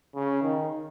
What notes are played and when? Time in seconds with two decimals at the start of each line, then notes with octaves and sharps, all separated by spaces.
0.15 C#3
0.42 D#3